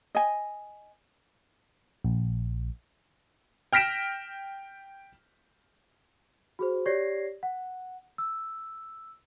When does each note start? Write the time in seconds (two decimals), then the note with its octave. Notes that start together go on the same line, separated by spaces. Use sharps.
0.15 D#5 G#5
2.05 A#1
3.73 G5 F6 A#6 B6 D7 E7
6.59 F#4 G#4 C5
6.86 G4 C#5 D5 G#6 A#6 C7
7.43 F#5
8.18 E6